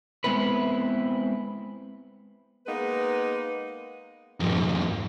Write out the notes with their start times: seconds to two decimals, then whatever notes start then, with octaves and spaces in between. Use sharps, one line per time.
0.24 G#3 B3 C4 E4 B4
2.67 G#3 A#3 B3 D#4 B4
4.40 F2 G#2